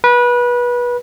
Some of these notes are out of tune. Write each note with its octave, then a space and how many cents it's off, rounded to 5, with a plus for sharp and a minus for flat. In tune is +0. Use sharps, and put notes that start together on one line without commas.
B4 -25